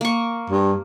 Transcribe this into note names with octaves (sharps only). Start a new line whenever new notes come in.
A#3 C#6
G2